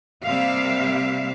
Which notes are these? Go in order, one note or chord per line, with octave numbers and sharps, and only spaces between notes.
C3 G3 A#3 E5 F5